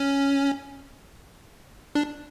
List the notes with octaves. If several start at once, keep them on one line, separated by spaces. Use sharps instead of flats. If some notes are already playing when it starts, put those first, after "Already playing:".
Already playing: C#4
D4